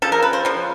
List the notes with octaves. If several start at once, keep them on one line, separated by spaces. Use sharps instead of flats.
C#3 F3 A4
A#4
B4
C5
C#3 F3